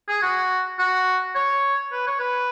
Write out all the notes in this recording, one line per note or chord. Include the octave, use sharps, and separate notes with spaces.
G#4
F#4
F#4
C#5
B4
C#5
B4